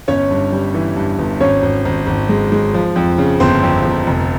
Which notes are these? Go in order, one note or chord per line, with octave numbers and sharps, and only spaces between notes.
G1 C#4 C#5
G2
G3
E3
G2
G1
G#1 C#4 C#5
G#1
G#1
G#1
G#3
G#3
F3
F2
C#3
G1 C4 C5
F2
G1
F1